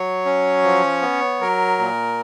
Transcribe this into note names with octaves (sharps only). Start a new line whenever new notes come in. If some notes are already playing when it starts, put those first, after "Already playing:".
Already playing: F#3 C#5
C#4
F3
B3
F#3 A#4
A#2